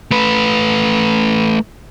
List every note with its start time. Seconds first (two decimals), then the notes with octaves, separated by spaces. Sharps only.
0.11 A3 B4